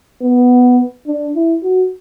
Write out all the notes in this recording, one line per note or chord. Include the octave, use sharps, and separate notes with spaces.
B3
D4
E4
F#4